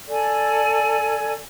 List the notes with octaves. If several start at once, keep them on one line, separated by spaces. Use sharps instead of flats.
A4 D5 G#5